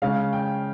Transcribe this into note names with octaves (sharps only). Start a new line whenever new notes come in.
C#3 G#3 C#4 F5
G5